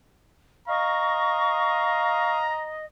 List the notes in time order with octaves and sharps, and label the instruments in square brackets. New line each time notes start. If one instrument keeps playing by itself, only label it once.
[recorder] D#5 [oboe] F5 [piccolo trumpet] A#5 [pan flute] C#6